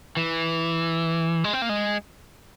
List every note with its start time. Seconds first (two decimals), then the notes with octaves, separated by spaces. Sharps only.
0.17 E3
1.44 G#3
1.53 C4
1.62 A#3
1.69 G#3